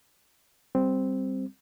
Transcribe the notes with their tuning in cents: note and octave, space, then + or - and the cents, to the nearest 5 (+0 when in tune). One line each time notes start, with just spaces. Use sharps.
G3 +0 C4 +0